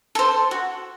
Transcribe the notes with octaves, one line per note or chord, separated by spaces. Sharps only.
A4 C5
F#4